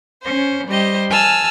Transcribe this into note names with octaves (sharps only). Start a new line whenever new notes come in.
C#4 C5
G3 G4 C5 D#5
G#5 A5 E6 F6